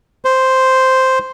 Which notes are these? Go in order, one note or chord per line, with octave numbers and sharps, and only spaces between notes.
C5